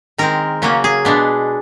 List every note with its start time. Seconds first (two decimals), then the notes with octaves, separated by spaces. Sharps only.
0.18 D#3 G#3 C4 A#4
0.62 C#3 F#3 A#3 C#4
0.84 G#4
1.05 B2 G#3 B3 D4